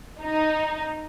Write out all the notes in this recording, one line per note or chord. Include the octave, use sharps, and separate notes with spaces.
D#4